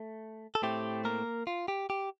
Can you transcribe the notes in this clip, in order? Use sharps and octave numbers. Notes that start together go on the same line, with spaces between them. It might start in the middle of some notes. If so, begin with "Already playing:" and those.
Already playing: A3
A4
A2 A3 C4 G4
A#3 A#4
F4
G4
G4